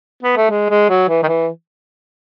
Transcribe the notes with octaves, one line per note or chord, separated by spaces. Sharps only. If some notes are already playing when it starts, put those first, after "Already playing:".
B3
A3
G#3
G#3
F#3
E3
D#3
E3